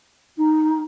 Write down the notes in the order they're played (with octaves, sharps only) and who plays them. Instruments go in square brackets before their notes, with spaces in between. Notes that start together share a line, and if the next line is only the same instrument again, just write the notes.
[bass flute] D#4